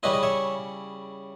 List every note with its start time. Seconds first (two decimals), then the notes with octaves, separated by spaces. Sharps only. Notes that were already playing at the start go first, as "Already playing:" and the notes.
0.03 C#3 G3 C#4 E4 B4 D#5
0.13 D#5
0.23 C#5 E5